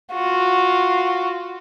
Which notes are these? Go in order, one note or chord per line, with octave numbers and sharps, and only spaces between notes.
F4 F#4